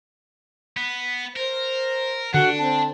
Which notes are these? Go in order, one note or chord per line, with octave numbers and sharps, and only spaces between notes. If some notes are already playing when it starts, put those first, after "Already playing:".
B3
A#4 C5
D3 D4 F#4 F#5
C4 A5